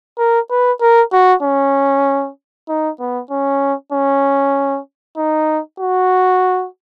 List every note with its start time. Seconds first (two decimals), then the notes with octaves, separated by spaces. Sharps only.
0.18 A#4
0.50 B4
0.81 A#4
1.13 F#4
1.43 C#4
2.69 D#4
3.00 B3
3.31 C#4
3.92 C#4
5.17 D#4
5.80 F#4